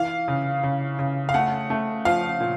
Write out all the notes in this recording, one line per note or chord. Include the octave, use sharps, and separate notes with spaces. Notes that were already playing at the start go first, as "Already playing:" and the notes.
Already playing: E3 F5
C#3
C#3
C#3
F5
A3 F#5
A3
F3 F5
A#2